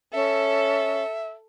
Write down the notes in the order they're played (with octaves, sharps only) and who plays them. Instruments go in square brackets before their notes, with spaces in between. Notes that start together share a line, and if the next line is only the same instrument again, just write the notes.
[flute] C#4 [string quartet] A4 [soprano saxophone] E5